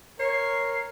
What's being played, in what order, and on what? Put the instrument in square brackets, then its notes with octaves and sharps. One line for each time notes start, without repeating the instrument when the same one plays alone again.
[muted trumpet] A#4 [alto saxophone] C#5 [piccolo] C7